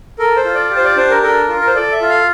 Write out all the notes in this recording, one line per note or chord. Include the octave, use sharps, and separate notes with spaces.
A4 A#4
C5
F4
D5
G4
C5
D5
D4 C5
A#4
A4 A#4
F4
A#4
C5
A4 D5
E5
F4
F5